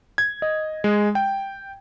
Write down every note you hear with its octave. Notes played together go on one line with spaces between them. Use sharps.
G#6
D#5
G#3
G5